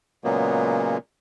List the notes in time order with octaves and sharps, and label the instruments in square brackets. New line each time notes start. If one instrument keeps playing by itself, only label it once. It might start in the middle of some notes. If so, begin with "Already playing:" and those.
[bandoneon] A#2 C#3 F#3 G#3 A#3 B3